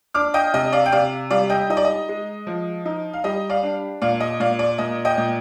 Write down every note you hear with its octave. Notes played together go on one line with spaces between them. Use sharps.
D4 D6 F6
D#5 G5
C3 D#5
D5 F5
G5
C3 D5 F5
G3 D5 F5
D#5 G5
D#4 D#5
D5
D#5
G#3
F3
D#4
F5
G3 D#5
D5 F5
D4
A#2 D5 F5
D#5
A#2 D5 F5
D5
A#2 D#5
D#5 G5
A#2